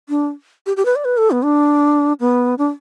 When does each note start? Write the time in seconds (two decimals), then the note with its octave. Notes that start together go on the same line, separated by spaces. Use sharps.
0.09 D4
0.66 G4
0.77 G4
0.85 B4
0.96 D5
1.05 B4
1.17 A4
1.31 B3
1.44 D4
2.20 B3
2.58 D4